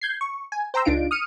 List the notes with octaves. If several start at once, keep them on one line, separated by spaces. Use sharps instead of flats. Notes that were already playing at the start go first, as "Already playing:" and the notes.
G6 G#6 C7
C#6
G#5
C5 G5 A#5 C6 E6
C#2 D4 D#4 F4 D7
D#6 F6 C#7 D#7